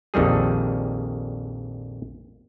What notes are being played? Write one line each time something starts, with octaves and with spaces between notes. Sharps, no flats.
A#1 F2 D#3 G3 G#4